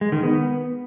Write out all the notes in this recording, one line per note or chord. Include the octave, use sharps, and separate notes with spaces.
G#3
D#3
B3